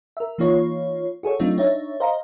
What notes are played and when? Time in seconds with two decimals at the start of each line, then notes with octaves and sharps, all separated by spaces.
0.17 A#4 E5
0.38 E3 A#3 D#4 F4 C#5
1.23 F#4 G#4 A4 C#5
1.39 F#3 A3 C4 D4 D#4 F4
1.58 D4 D#4 C#5 E5
2.00 C5 D#5 F5 A#5